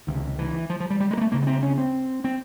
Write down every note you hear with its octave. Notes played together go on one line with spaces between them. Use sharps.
C#2 C3 D#3
E3
F3
F3
G3
G3
G#3
A#3
A3
D2 C#3 A#3
B3
C4
C#4
C4
C4